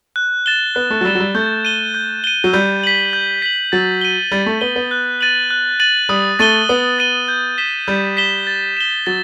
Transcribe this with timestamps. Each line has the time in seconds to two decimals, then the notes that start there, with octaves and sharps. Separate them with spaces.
0.16 F#6
0.46 A6 E7 G7
0.75 B3 F#6
0.91 A3
1.01 F#3
1.05 G3 A6 E7 G7
1.15 F#3
1.20 G3
1.35 A3 G6
1.65 D#7 G7
1.94 G6
2.24 D#7 G7
2.44 F#3
2.53 G3 G6
2.83 B6 F#7
3.13 G6
3.42 B6 F#7
3.72 F#3 A6
4.01 D#7 G7
4.32 G3 A6
4.46 A3
4.61 B3 D#7 G7
4.76 B3
4.91 F#6
5.21 A6 D#7 F#7
5.50 F#6
5.80 A6 D#7 F#7
6.09 G3 D#6
6.39 A3 A6 D#7 G7
6.69 B3 D#6
6.99 A6 D#7 G7
7.28 G6
7.58 B6 E7 G7
7.87 G3 G6
8.17 B6 E7 G7
8.47 A6
8.77 E7 G7
9.06 F#3 A6